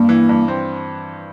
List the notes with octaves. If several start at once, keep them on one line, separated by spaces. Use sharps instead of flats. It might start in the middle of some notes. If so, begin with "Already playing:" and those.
Already playing: G2 A#3
E3
G2
C4